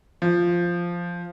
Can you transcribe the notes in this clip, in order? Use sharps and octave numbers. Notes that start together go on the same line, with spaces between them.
F3